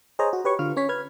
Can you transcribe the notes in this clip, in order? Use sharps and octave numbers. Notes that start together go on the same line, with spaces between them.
G#4 C5 C#5 D#5 G#5 A#5
F#4
G4 B4 C#5 C#6
D3 F4 F6
C#4 C#5 B6
B4 F6 G#6